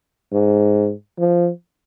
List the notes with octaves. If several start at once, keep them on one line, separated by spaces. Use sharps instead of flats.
G#2
F3